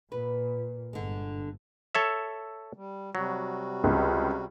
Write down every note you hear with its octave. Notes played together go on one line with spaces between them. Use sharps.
A#2 B4
G1 G2 D3 G#3
A4 C#5 E5
G3
C3 F#3 G3 F#4
C#2